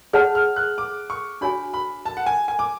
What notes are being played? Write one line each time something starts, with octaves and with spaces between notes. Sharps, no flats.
G#4 C#5 F#5 A5 F6
F6
F#6
D6
C#6
D4 F#4 C#5 G#5 B5
B5
A5
F#5
G#5
G#5
D6